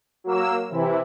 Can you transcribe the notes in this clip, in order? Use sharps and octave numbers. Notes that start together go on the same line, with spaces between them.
F#3 A#3 E6
C3 E3 E4